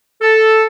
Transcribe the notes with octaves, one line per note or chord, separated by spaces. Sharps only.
A4